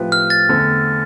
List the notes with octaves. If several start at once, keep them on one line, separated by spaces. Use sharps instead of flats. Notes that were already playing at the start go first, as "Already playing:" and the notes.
Already playing: A2 F3 C4 G4 B4
F6
A6
E2 D3 A3 C4